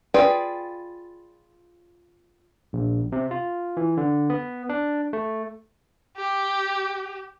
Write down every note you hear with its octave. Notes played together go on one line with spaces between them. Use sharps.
F4 G#4 B4 D5 G5
A#1
C3
F4
E3
D3
B3
D4
A3
G4